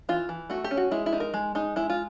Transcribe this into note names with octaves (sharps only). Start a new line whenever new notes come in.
E3 F4
E3
A3 F#4
G4
C#4
F#4
G#3 E4
E4
D#4
A#4
G#3
G#3 D#4
G#3 E4
F4